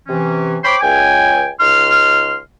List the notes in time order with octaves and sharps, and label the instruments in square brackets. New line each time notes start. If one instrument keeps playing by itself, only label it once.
[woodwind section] C3 E3 C#4
C5 C#5 G5 B5 C6 D6
C#2 G5 G#5
C#2 D#4 C6 F6